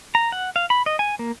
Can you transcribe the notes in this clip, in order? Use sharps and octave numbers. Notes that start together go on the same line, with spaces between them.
A#5
F#5
F5
B5
D#5
G#5
A#3